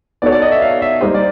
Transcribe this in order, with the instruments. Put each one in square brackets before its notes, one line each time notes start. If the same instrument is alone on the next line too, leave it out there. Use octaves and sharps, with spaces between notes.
[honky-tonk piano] B3 D#4 F#4 A4 C#5 [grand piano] D5
[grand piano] D5
D#5
E5
F5
E5
[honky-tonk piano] G3 A#3 D#4 G4 C5 [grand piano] D#5
[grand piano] D5